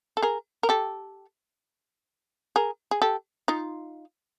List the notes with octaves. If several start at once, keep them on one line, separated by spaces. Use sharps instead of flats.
A4
G#4 A#4
A#4
G4 A4
G#4 A#4
G#4
G4 A4
D#4 F4